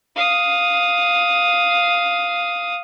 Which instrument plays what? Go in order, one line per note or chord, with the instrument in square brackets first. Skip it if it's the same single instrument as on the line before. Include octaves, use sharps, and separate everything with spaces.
[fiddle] F5 D#6